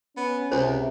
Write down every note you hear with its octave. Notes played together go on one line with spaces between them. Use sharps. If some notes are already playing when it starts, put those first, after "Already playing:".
B3 C#4
C#2 C3 C5